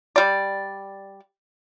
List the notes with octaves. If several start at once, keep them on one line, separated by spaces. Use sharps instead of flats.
G3 D5